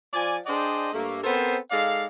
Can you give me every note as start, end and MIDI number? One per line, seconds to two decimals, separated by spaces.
0.14 0.37 53
0.14 0.37 74
0.14 0.37 80
0.46 0.92 62
0.46 0.92 68
0.46 0.92 72
0.46 0.92 74
0.46 0.92 75
0.46 0.92 79
0.93 1.21 43
0.93 1.21 57
0.93 1.21 58
1.23 1.57 59
1.23 1.57 60
1.23 1.57 69
1.23 1.57 70
1.23 1.57 72
1.71 2.06 56
1.71 2.06 63
1.71 2.06 69
1.71 2.06 74
1.71 2.06 77